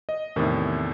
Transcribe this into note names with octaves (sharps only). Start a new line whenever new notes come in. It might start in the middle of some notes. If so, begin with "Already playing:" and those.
D#5
E2 A2 C3 D#3 A3